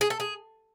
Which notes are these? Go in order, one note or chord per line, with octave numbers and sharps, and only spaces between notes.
G#4
A4
G#4